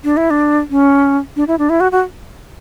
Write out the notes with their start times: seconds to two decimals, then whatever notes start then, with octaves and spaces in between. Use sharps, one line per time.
0.04 D4
0.17 E4
0.30 D4
0.71 C#4
1.36 D4
1.48 E4
1.59 D4
1.69 E4
1.80 F#4
1.92 F#4